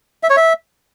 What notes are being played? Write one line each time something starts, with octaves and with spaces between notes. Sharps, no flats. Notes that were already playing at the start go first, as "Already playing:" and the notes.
E5
C#5
E5